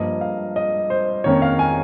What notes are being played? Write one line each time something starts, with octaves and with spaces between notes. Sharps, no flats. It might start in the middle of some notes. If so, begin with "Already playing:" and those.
Already playing: G2 F3 A#3 D#5
F5
D#5
C5
F2 D#3 A#3 C#4 C#5
F5
G#5